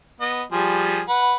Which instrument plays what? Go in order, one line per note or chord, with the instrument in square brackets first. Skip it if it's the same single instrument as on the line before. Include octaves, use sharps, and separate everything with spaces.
[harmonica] B3 D#5
F3 G3 G#4
B4 F#5